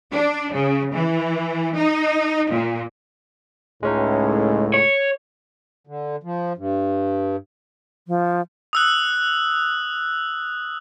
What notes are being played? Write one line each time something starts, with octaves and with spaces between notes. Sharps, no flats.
D4
C#3
E3
D#4
A#2
C#2 A2 G#3 C#4 D#4
C#5
D3
F3
G2
F3
D#6 E6 F#6